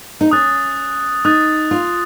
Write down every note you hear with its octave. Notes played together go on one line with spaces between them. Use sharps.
D#4
C#4 D#6 F#6 A6
D#4 D#6 F#6 A6
F4